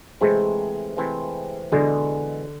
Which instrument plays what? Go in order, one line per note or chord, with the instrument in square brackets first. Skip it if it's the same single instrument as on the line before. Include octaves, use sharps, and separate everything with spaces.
[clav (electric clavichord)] C3 E3 A3 C4 [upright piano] G#3
[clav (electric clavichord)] C3 E3 A3 C4
[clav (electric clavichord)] E2 B2 G#3 [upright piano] D3